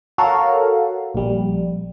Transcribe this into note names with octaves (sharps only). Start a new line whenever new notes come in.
F#4 A4 A#4 C#5 F5
A#1 G3